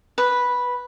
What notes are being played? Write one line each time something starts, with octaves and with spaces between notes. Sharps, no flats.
B4